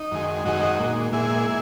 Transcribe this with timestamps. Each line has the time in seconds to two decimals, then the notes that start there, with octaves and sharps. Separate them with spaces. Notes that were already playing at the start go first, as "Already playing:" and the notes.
Already playing: D#4
0.11 F#2 D#3 G#3
0.45 F#2 D#3 G#3 D#4 F#4
0.79 A#2 G#3
1.12 A#2 G#3 E4 G#4